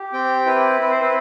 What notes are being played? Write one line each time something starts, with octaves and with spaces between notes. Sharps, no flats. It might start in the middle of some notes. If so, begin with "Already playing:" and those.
Already playing: G4
C4 G5
E4 B4
C4 B4
C5
B4